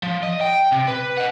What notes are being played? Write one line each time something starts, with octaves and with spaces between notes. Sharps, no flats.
F3
D#5
G5
C3
B4
D#5 F#5